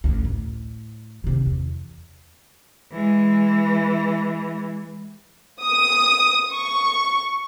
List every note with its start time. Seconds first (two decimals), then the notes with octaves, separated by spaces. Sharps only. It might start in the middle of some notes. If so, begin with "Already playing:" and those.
0.04 A1 D2
0.25 A2
1.24 C3 D#3
1.46 E2
2.92 E3 G#3
5.62 D#6
6.53 C#6